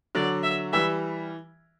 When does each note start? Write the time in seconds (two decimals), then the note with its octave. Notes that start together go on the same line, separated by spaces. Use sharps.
0.15 D3 F#3 D5
0.43 E5
0.73 E3 G3 E5